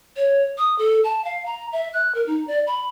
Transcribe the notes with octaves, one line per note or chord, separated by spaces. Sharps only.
C#5
D#6
A4
A5
F5
A#5
E5
F#6
A#4
D#4
D5
B5